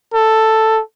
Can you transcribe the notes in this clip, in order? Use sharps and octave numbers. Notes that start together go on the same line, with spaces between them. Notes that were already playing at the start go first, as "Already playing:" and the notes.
A4